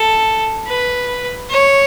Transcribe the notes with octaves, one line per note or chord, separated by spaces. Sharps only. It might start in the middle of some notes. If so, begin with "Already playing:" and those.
Already playing: A4
B4
C#5